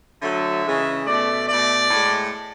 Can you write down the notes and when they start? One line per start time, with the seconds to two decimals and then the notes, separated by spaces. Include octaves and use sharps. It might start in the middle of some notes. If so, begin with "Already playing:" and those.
0.22 D3 F#3 A3 E5
0.65 C#3 E3 G#3
1.06 B2 A3 D5
1.49 B2 A3 D5
1.91 A2 G#3